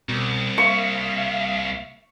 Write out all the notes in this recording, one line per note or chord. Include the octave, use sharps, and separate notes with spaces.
C2 B2
A#3 E5 F5 C#6